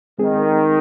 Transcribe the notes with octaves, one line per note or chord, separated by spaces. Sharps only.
D#3 G#3 C4 G#4